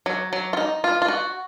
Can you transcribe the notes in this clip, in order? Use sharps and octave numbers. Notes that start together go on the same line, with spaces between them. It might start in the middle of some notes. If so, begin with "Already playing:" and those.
F#3
F#3
F4
D#4
F4
F4
F#4